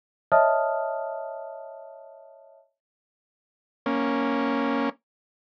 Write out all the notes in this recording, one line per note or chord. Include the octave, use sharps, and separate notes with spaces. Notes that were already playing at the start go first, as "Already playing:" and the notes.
C#5 D#5 E5 A5 D#6 F6
A#3 C#4